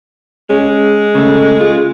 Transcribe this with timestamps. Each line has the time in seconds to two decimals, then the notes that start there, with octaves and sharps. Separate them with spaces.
0.50 G#3 C#4
1.15 C#3 A3
1.61 F4